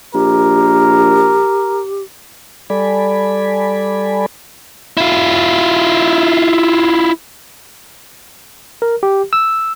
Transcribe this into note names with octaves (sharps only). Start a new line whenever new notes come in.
A#1 G4 A#4
G3 A4 D5 G#5 B5
E4 F4
A#4
G4
E6